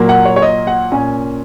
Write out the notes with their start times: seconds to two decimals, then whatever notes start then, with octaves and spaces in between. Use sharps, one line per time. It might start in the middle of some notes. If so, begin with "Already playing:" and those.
Already playing: A#2 F#3 A#3
0.09 F#5
0.25 C#5
0.36 C#5
0.42 D#5
0.67 F#5
0.91 A#2 A#3 C#4 G#5